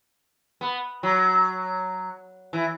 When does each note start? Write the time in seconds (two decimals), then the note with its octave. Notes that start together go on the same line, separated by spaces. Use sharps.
0.61 B3
1.03 F#3
2.53 E3